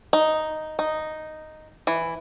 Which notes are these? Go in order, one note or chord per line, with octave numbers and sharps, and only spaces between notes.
D#4
D#4
E3